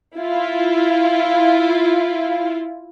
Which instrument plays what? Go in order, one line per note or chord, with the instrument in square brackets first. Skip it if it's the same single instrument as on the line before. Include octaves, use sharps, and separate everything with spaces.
[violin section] E4 F4